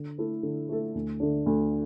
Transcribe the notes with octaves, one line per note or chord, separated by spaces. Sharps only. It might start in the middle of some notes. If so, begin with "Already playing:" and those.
Already playing: D3
A3 E4 A4
D3
A3 E4 A4
D2
D3 A3 D4
D2